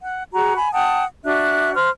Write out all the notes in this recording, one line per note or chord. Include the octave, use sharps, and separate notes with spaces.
F#5
F#4 G#4 A#5
G#5 B5
F#5 G5 A5 D#6
D4 F#4 E5 F#6
C5 F6